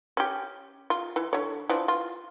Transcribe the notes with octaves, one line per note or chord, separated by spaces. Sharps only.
C#4 G4
F4
E3
D3 C#5
E3 F3 D4
F4